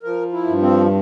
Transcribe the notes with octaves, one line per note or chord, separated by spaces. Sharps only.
F3 A#4
E4
G2
C4